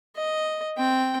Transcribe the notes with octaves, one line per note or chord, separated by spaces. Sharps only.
D#5
C4 G5